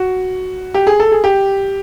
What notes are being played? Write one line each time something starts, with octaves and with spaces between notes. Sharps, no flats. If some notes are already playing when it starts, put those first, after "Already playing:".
Already playing: F#4
G4
G#4
A4
G#4
G4